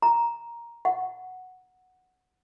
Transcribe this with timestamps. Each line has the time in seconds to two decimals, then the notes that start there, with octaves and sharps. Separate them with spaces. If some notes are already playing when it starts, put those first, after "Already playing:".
0.02 A#5
0.85 F#5